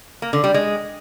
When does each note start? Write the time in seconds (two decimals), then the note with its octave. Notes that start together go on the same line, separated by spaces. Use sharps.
0.22 A#3
0.33 D3
0.44 G3
0.54 G#3